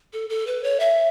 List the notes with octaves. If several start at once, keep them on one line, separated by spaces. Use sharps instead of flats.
A4
A4
B4
C#5
E5